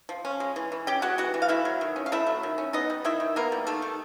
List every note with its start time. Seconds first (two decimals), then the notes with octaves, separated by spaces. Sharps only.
0.09 F3
0.25 C#4
0.40 G#3
0.56 E3
0.72 E3
0.87 C#4 G4 G5
1.02 G#3 F#4 F#5
1.18 E3 F#4 F#5
1.34 E3
1.42 F5
1.49 A3 E4 E5
1.65 F#3
1.81 D#3
1.96 C#4
2.06 F5
2.12 A3 E4 E5
2.27 F#3
2.43 D#3
2.58 C#4
2.73 B3 D#4 D#5
2.90 G3
3.05 D#3 E4 E5
3.20 D#3
3.36 A#3 B3 A#4
3.52 G3
3.67 D#3 A3 A4
3.82 D#3